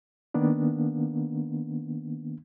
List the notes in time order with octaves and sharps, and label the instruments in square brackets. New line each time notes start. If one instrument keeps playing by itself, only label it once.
[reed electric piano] D#3 A#3 B3 D4